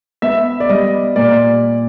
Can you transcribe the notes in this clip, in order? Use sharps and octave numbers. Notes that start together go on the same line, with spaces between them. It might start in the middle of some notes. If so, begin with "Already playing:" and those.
B3 E5
D5
G3 D#5
A#2 D5